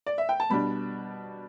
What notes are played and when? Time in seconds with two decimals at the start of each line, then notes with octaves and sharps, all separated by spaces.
0.07 D5
0.18 E5
0.29 G5
0.40 A5
0.50 B2 G3 D4 B5